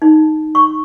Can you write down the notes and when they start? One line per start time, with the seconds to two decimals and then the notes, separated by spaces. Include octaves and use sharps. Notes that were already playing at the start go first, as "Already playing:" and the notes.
0.02 D#4
0.55 C#6